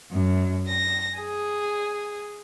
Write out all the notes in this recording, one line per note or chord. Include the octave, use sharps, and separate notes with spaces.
F#2
A#6
G#4